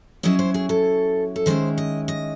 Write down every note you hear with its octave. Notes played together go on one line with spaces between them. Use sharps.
F#3 C#4 E4 D#5
C5
G#4
A4
A4
D#3 G#3 C#4 E4 C5
D#5
D#5